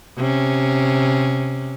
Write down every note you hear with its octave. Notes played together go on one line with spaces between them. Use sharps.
C3 C#4